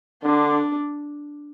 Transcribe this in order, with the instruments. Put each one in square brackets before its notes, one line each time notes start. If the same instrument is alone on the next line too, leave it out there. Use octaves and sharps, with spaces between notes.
[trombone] D3 [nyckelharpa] D4